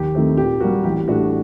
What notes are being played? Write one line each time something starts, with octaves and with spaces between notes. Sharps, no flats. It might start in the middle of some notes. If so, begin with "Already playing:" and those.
Already playing: D#2 G4
D#3 A3 C4
A#2 G4
G3 A#3 F#4
A1 G4
A2 A3 D4 F#4 G4